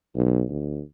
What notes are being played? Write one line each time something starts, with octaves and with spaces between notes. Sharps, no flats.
B1
D2